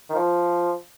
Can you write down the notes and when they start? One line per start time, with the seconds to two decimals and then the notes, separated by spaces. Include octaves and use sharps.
0.09 D#3
0.15 F3